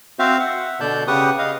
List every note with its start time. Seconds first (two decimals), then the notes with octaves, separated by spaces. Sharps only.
0.19 C4 F#4 C5 E5 F5
0.40 E5 F#5
0.80 B2 D3 D5 A5 G6
1.08 C#3 G4 B4 F#5 C#6 D#6
1.39 D#5 F5